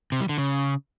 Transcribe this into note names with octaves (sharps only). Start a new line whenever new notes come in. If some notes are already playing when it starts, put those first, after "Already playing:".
C3
G3
D3
C#3